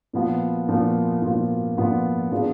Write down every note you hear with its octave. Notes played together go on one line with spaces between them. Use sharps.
A#2 F3 B3 F4
A#2 F3 B3 F4
A#2 F3 B3 F4
A#2 F3 B3 F4
F3 B3 D4 F4 G#4